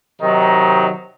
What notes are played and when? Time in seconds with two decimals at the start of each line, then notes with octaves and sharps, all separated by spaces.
0.22 C3 D#3 F#3 D#4